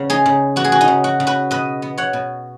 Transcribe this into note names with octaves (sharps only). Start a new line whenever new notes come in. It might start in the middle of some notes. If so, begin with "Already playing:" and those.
Already playing: C#3 B3
D#4 G#4
C#3
B3 F#4
G#4
F#4
D#4
C#3
F#4
C#3
F#4 B4
B2 B4 D#5
B3
C#5 F#5
B2